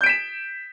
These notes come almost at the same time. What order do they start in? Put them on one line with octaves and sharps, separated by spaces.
G6 D7 B6 E7